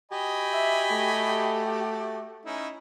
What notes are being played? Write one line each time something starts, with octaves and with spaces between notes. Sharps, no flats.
F#4 G4 D#5 G#5 B5
E5
A3
C#4 D#4 E4